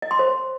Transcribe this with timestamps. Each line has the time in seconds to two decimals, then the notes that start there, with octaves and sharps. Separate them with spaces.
0.02 D#5
0.11 C6
0.19 C5